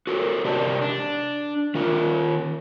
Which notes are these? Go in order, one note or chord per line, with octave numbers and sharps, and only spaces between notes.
F#4 A4 A#4
C3 G4 A#4 D5 A5
D4
D#3 F4 A#4